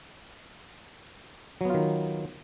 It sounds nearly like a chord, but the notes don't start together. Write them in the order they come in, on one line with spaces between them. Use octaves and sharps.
F#3 B3 F4 D#3